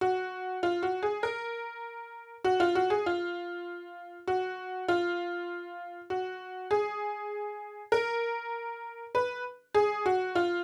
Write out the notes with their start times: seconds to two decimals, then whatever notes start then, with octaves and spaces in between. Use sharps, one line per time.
0.01 F#4
0.63 F4
0.83 F#4
1.03 G#4
1.23 A#4
2.44 F#4
2.60 F4
2.75 F#4
2.90 G#4
3.06 F4
4.28 F#4
4.88 F4
6.10 F#4
6.71 G#4
7.92 A#4
9.15 B4
9.75 G#4
10.06 F#4
10.35 F4